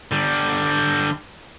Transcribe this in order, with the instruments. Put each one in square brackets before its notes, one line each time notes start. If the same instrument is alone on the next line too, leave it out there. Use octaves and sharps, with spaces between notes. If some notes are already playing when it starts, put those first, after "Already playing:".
[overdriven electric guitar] D3 G3